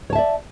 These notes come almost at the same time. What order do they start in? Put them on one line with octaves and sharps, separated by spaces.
C#5 A5 E5 D5